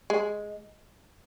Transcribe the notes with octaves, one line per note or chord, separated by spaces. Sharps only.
G#3